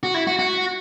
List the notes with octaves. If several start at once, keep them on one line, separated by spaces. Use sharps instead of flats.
F#4
E4
F#4
F#4